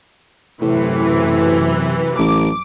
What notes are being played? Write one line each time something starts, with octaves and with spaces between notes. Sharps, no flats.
F#2 A2 C3 E3
A1 D6